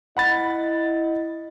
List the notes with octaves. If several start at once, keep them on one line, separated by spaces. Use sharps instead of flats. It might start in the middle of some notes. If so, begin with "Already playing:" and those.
E4 D#5 F#5 B5 A6